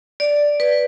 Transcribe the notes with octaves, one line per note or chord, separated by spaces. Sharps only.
D5
B4